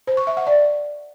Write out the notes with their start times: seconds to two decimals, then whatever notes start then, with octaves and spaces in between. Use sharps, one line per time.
0.07 C5
0.17 C#6
0.27 E5
0.37 F#5
0.47 D5